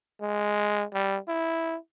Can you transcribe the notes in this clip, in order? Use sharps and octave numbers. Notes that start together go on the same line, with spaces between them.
G#3
G3
E4